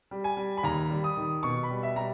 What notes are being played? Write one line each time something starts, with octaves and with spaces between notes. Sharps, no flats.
G3
G#5
G3
B5
D#2 A#5
G3
D#6
D#3
B2 C#6
B5
G3
E5
G3 A#5